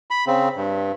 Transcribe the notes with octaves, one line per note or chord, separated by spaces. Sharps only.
B5
C#3 C4
G2